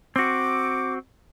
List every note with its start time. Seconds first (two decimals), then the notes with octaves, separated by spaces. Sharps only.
0.16 C4 F#4 D6